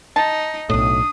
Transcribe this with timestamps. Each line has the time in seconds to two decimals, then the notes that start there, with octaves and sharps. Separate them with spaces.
0.16 D#4 A5
0.70 B1 A2 D4 D#6